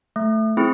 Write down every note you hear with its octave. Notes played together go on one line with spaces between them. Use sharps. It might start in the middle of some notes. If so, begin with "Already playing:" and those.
A3
C4 E4 G#4